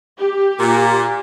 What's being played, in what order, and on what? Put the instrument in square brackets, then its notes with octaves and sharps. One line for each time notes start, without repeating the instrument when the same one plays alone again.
[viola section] G4
[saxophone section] A#2